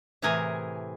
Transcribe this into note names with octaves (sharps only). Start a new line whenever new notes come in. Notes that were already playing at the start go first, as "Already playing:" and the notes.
A2 C3 E3 G#4 A#4 G#5